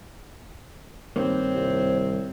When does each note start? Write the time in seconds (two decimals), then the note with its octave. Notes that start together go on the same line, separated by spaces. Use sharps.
1.16 G2 D#3 A#3 C4 C5 C#5
1.55 C2